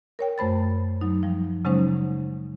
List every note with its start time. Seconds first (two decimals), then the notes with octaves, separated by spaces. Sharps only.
0.19 A#4 C#5 G5
0.38 F#2 A3 C5 B5 A6
1.01 F#3 D#4
1.23 F3 G3
1.65 C#3 F#3 G#3 C#4 D#4 C5